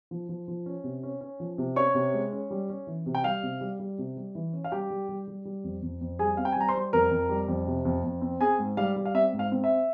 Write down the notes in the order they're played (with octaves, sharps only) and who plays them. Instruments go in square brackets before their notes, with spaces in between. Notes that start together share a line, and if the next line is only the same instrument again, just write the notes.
[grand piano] F3
F3
F3
C#4
C3
C#4
C#4
F3
C3
C#4 C#5 C#6
C3
G#3
C#4
G3
C#4
E3
C3
G5
G3 F5
C3
G3
G3
C3
G3
E3
C#4
F5
G3 G4 G5
G3
G3
G3
G3
F2
F2
F2
G3 G#4 G#5
C4 F5
G5
G#5
G3 A#5
C5 C6
G3
F2 A#4 A#5
F2
G3
F2
C3
F2
F2
C4
C4 G#4 G#5
G#2
G3 F5
G3
F5
C4 E5
G#2
F5
C4
E5